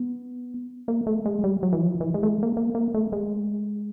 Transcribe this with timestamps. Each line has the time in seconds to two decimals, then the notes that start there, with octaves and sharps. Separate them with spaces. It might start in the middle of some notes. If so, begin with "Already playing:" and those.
Already playing: B3
0.88 A#3
1.07 A3
1.26 G#3
1.44 G3
1.63 F#3
1.73 E3
1.82 F3
2.00 E3
2.14 G#3
2.23 A3
2.28 G#3
2.43 A#3
2.57 A#3
2.75 A#3
2.94 A3
3.12 G#3